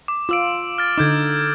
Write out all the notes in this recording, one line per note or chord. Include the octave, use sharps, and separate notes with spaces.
D6
F4 D6 E6 D7
F6 A6
D3 D#4 D6 G6 G#6